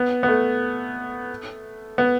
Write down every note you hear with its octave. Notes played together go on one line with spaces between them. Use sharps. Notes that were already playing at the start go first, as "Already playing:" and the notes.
Already playing: B3
B3
A3
B3